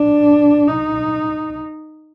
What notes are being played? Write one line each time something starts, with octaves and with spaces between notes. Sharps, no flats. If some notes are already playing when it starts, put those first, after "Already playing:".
Already playing: D4
D#4